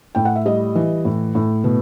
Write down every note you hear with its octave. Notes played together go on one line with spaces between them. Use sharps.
A2 G5
F#5
E5
G3 D#5
E3
A2
A2
B2